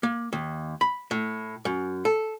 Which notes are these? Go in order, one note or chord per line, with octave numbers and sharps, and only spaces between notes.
A#3
D#2
B5
A2
F#2
A4